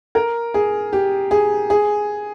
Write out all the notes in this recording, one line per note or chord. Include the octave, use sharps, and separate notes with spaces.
A#4
G#4
G4
G#4
G#4